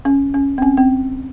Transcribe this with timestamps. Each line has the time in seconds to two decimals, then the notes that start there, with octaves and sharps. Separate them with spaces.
0.05 C#4
0.34 C#4
0.58 C4
0.62 C#4
0.77 C4